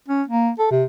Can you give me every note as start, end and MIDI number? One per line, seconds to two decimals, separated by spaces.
0.08 0.23 61
0.28 0.50 58
0.59 0.68 69
0.71 0.84 48